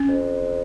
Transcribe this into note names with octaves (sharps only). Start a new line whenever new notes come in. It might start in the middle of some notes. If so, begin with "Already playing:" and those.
Already playing: C#4
F2